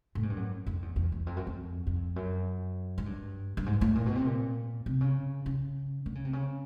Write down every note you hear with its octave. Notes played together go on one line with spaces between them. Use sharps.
A2
G#2
G2
F#2
F2
E2
E2
E2
F2
F#2
F2
F2
F#2
G#2
G2
G2
G#2
A2
A#2
B2
C3
A#2
C3
C#3
C#3
D3
C#3
C3
C#3